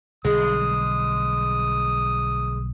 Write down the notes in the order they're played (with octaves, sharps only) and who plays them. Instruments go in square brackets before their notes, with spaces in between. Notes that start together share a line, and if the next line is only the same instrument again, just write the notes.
[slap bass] B1 D3 G3 [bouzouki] G#3 [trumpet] D#6